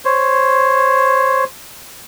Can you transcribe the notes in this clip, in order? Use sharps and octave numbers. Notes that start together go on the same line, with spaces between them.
C5 C#5